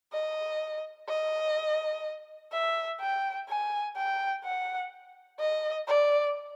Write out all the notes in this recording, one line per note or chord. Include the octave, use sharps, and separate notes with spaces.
D#5
D#5
E5
G5
G#5
G5
F#5
D#5
D5